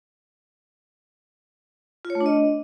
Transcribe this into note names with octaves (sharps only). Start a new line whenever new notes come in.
F4
C#5
A3
D4
D#5